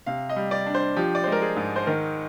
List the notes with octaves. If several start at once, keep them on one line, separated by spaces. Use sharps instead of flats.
C3 F5
D#5
G3
D5
D4
C5
F3 G4
D5
G#3 C5
A#4
G#4
G#2
C5
D#3 A#4